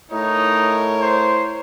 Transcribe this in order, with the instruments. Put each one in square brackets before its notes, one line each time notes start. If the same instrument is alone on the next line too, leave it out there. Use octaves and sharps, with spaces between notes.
[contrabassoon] A2 [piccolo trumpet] D#4 [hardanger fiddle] A#4 C#5
[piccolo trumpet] C5